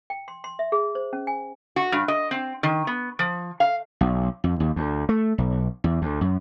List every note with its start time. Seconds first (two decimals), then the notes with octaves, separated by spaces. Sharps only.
0.10 G5
0.28 C6
0.44 C6
0.59 E5
0.72 G#4
0.95 C5
1.13 C#4
1.27 G#5
1.76 F#4
1.92 G2
2.08 D#5
2.31 C4
2.63 D#3
2.87 B3
3.19 F3
3.60 F5
4.01 B1
4.44 F2
4.60 D#2
4.76 D2
5.09 A3
5.38 B1
5.84 E2
6.02 D2
6.21 F#2